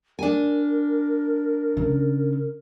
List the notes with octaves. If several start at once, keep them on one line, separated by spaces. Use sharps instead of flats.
D4 A#4 G#5
C#3